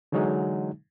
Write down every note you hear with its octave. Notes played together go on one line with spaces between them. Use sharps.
D3 E3 F#3 G#3 D#4